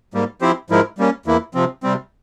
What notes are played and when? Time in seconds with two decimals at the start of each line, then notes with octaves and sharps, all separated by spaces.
0.14 G#2 G3 A#3
0.41 F3 C4 E4 G4 C5
0.70 G#2 F3 G#3 E4 A#4
0.98 G3 A#3 C#4
1.26 E2 E3 A#3 E4
1.54 C3 F3 C4
1.83 C3 G3 C4